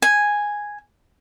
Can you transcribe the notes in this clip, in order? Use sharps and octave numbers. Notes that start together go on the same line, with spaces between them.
G#5